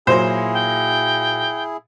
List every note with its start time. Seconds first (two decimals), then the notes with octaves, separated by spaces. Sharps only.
0.07 A#2 F#3 E4 G#4 C5
0.54 G5